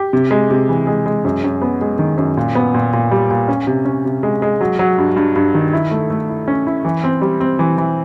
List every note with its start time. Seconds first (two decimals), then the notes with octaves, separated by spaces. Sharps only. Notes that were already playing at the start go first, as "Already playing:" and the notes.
Already playing: G4
0.13 C3
0.31 G#3
0.51 C3
0.69 E3
0.87 G#3
1.06 G#3
1.24 F#2
1.44 F#2
1.62 B3
1.81 G#3
1.99 D#3
2.17 F#2
2.37 A#2
2.55 B3
2.74 A#2
2.93 A#2
3.11 G3
3.31 A#2
3.48 C#4
3.67 C3
3.85 C#4
4.05 C3
4.23 G#3
4.42 G#3
4.61 F#3
4.79 F#3
4.98 G2
5.16 G2
5.36 G2
5.55 D#3
5.73 E4
5.91 A3
6.10 A3
6.29 E4
6.48 C#4
6.67 E4
6.85 E3
7.04 C4
7.21 G3
7.40 C4
7.59 E3
7.78 E3